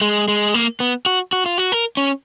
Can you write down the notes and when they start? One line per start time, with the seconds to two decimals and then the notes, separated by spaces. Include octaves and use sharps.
0.01 G#3
0.28 G#3
0.54 A#3
0.80 B3
1.06 F#4
1.33 F#4
1.46 F4
1.58 F#4
1.72 A#4
1.97 C#4